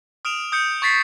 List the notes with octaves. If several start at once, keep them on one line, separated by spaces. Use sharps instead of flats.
D#6 F6 D7 E7 F7
D#6 G6 C#7
C#6 G#6 A6 B6 C7